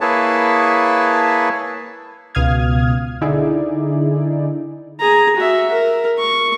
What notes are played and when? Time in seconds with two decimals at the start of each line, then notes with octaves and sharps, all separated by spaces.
0.01 A#3 E4 G#4 B4 C#5 A5
2.35 C#2 B2 F5 D#6 F6 G#6
3.21 D3 D#4 E4 G#4 D5
5.00 G#4 A#5
5.36 F#4 E5
5.72 A#4
6.18 C#6